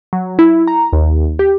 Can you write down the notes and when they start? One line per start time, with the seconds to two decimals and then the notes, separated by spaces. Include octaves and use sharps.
0.13 F#3
0.39 E4
0.67 A#5
0.93 D#2
1.39 G4